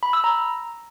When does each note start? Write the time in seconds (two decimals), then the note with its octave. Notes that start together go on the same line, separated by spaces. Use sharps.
0.03 B5
0.13 E6
0.24 A#5